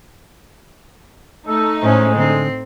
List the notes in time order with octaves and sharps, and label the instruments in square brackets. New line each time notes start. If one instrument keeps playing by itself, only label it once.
[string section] A3 D#4 [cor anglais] A4
[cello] A2 C#4 [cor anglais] G#3 [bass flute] C5
[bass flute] D3 [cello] C4